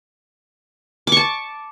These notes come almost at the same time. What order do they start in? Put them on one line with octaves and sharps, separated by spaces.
D6 C#6 A5